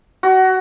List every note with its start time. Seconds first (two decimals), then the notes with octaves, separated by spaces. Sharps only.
0.23 F#4